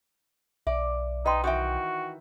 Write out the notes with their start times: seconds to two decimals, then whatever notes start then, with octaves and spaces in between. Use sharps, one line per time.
0.67 B1 D5 E5
1.26 D#4 B4 D#5 G5 C6
1.44 D#3 E3 F#4 E5 G5 D#6